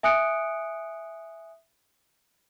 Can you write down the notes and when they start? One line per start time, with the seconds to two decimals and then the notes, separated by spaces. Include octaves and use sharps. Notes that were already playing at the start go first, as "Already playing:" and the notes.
0.03 E5 G#5 D#6 F#6 C#7 D7